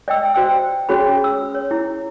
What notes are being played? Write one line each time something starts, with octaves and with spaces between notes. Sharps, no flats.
D5 D#5 G5 E6
F#4 C5 D5 G5 E6
C#4 F#4 G#4 C#5 B5
E6
C#5
E4